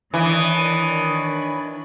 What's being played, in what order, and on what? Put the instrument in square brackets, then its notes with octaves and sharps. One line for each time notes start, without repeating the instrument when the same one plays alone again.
[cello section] D#3 D4 [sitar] E3 [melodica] C#5 B5 [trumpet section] D#6